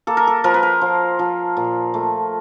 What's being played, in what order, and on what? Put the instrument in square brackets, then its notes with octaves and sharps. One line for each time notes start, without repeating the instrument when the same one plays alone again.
[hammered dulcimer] A#3 A4
A#4
A4
F3 A#4
B4
A#4
F3
F3
A#2
A3